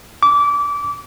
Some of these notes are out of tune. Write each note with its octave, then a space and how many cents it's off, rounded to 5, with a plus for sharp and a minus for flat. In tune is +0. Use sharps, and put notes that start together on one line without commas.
D6 -25